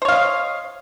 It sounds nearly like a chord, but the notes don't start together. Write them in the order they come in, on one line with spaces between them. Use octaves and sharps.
C5 C#5 F5 D#5